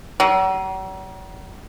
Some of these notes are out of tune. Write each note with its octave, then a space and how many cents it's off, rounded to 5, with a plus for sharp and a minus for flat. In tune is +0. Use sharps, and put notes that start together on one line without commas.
F#3 +45